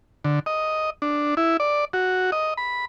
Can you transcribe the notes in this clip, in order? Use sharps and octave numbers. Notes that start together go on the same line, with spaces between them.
D3
D#5
D4
E4
D5
F#4
D#5
B5